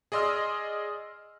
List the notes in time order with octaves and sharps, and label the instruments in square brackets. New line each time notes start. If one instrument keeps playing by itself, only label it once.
[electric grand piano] G#4 D5 D#5 C6 E6 F6